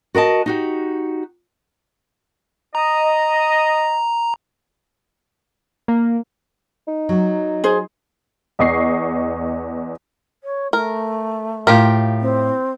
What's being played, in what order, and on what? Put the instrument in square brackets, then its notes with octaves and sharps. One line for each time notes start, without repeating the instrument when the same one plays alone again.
[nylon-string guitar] F#4 A#4 D#5 A5
D#4 F#4 G4
[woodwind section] D#5 [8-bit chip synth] A#5
[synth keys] A#3
[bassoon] D#4
[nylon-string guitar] F#3 F#4
[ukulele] G#4 C5
[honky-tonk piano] E2 D#5 C#6 C7
[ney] C#5
[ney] A3 [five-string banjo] A#4
[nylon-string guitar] A2 F5 [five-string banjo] F4 G4 A#4
[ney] C4